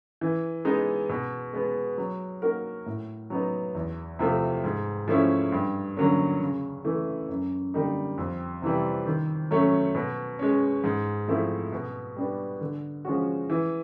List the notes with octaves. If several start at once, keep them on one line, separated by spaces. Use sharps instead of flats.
E3
G#3 B3 D#4
B2
G#3 B3
F#3
A#3 D#4 F#4 A#4
A2
F#3 B3 D#4
E2
C3 F3 A3
G#2
F3 A3 C#4 E4
G2
D3 F#3 A#3 C#4
C#3
E3 A3
F#2
D3 G3 A#3 D#4
F2
C3 E3 G3
D#3
F#3 A3 C#4
B2
G#3 C#4
G#2
F3 A3 C4 E4
B2
G3 B3 D4
D3
F3 G#3 C#4 F#4
E3